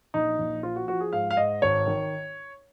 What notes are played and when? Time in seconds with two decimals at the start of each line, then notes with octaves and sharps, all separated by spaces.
0.14 A#1 D#4
0.39 A#1
0.63 F3 F4
0.76 F#4
0.88 F3 F#4
1.01 G#4
1.13 G#2 F5
1.30 F5
1.37 G#2 D#5
1.62 G#1 C#5
1.87 D#3